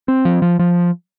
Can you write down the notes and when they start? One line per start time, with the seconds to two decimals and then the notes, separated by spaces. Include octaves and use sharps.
0.08 C4
0.25 F3
0.42 F3
0.59 F3